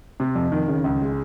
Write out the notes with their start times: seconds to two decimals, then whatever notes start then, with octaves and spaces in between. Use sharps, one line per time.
0.20 C3
0.35 F2
0.52 D#3
0.68 C#3
0.84 C#2
1.01 G#3